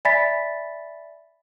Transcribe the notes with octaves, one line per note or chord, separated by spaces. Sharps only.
D5 E5 G#5 B5 A6 B6